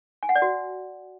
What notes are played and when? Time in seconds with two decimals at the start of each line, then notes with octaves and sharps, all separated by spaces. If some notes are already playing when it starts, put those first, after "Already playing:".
0.23 G#5
0.29 F#5
0.36 D5
0.42 F#4